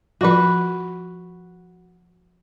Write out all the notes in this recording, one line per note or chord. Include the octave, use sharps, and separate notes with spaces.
F3 F4 F#4 B4